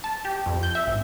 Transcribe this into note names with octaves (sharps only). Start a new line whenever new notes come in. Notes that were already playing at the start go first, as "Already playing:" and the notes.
A5
G4
F2
G6
E5
G#1